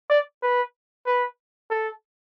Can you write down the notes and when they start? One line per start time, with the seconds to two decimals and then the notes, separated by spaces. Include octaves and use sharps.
0.09 D5
0.42 B4
1.06 B4
1.70 A4